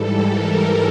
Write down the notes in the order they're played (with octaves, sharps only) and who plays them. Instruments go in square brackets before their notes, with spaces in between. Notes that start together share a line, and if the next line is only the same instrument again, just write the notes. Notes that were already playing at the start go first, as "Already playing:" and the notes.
Already playing: [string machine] G#2 E3 G3 A4
A#4